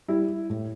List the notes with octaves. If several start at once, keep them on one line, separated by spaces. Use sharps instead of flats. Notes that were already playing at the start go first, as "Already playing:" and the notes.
G3 E4
A2